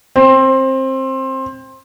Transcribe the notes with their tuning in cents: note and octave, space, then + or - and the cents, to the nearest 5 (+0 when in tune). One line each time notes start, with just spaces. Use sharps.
C4 +20